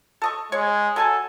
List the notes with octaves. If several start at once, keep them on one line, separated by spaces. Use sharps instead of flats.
A4 D#5 C#6
G#3 C#5
F#3 A4 G#5 A5